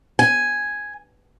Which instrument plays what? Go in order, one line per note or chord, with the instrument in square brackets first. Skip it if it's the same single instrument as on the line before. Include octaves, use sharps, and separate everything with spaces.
[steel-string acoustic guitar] G#5